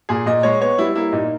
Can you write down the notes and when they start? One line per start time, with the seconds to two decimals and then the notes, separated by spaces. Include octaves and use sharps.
0.09 A#2 G#4
0.26 A#2 D#5
0.43 G#3 C#5
0.60 B3 C#5
0.78 G3 E4
0.95 A#3 E4
1.12 A#2 D#4